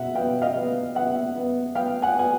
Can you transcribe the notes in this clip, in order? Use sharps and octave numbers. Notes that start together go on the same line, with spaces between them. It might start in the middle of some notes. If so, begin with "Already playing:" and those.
Already playing: B2 E5 F#5
B3 F5 G5
D#5 F5
B3
B3 E5 F#5
B3
B3 F5 G5
F#5 G#5
B3 G#5